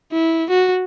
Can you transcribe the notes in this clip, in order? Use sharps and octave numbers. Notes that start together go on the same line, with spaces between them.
E4
F#4